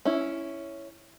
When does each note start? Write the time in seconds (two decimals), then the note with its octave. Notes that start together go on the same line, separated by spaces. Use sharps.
0.05 C#4 E4